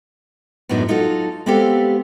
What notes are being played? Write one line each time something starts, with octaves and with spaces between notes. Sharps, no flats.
F#2 A2 F#3 B3 D4 D#4
F#3 D#4 F4 F#4 A4
G#3 B3 C4 G4 A4 F5